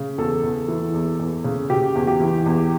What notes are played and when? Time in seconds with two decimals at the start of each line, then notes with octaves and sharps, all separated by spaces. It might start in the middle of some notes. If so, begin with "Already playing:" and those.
Already playing: C#3
0.18 E2 A4
0.43 E2
0.68 E3
0.94 E2
1.19 E2
1.44 C#3
1.70 C#3 G4
1.95 E2
2.07 G4
2.20 E3
2.46 E2